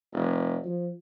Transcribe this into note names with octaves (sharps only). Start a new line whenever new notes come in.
F1
F3